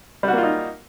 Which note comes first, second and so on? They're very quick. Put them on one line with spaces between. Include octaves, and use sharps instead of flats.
G3 F#4 A#3 F4 D#4